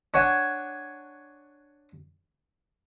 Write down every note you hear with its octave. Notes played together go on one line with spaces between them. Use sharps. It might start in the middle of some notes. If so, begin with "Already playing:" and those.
D4 C#5 F#5 G#5